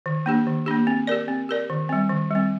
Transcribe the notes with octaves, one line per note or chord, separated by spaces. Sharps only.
D#3
A#3 D4 G4
D#3
A#3 D4 G4
C4
G4 A#4 D5
C4
G4 A#4 D5
D#3
G3 C4
D#3
G3 C4